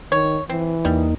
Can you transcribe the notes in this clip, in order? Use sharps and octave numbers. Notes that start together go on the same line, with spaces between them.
D#3 C#5
E3 C4
E2 G3 A#3 D#4